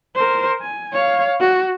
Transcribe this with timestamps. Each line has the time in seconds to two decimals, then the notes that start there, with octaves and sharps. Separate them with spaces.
0.15 A#4 C5
0.62 G#5
0.93 C#5 F5
1.40 F#4